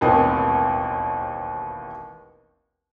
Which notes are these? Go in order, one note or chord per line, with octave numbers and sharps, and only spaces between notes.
E1 A1 D#2 B3 C4